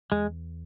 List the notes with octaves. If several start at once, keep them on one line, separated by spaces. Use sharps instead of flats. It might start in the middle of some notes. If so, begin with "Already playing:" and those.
E2 G#3